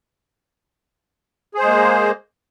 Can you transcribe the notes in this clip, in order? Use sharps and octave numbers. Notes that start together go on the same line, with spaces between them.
G#3 A#3 G#4 C5